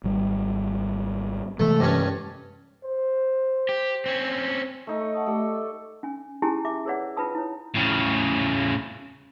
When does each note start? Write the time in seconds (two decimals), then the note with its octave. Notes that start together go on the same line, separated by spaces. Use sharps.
0.04 G#1 G3
1.60 C3 E3 G#3 A3
1.80 G2 C#4
2.85 C5
3.69 G4
4.06 C4 C#4
4.87 A3 D#4 A4
5.00 C#5
5.14 F#5 A5 D#6
5.26 A3 G4 A4 D5 E5
5.55 A4
6.03 C#4 G#5
6.42 C#4 E4 G4 G#4 G#5 A5
6.65 E5 D6
6.85 G#4 A#4 B4 C#5 D5 F#5
7.17 F4 B4 G5 A5 D#6
7.35 E4 C#5
7.76 A2 C#3